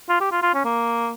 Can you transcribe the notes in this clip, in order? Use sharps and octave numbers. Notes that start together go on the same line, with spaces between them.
F4
G4
F4
F4
C#4
A#3